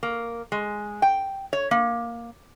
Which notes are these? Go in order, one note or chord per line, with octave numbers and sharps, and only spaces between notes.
A#3
G#3
G5
C#5
A#3